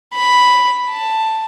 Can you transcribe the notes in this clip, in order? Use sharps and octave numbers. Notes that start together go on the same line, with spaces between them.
B5
A5